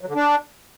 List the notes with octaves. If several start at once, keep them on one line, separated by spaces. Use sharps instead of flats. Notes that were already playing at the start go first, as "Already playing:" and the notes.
F#3
D3
D4